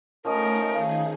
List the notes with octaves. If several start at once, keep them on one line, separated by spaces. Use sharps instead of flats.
F3 A3 C#4 D#4 A#4 D#5
D#3 D#4 G#4 F5